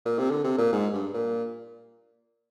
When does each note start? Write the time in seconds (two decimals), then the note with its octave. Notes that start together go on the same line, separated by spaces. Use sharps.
0.05 A#2
0.18 C3
0.30 D3
0.44 C3
0.58 A#2
0.73 G#2
0.93 G2
1.14 A#2